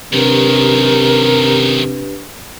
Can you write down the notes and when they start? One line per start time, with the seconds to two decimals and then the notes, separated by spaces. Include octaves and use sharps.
0.13 F#2 C3 D#3 D4 G4 A#4 B4